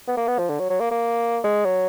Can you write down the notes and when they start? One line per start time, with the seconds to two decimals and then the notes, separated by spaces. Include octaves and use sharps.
0.08 B3
0.17 A#3
0.28 B3
0.38 F3
0.49 D3
0.59 F#3
0.70 F#3
0.80 A#3
0.91 A#3
1.44 G#3
1.65 F#3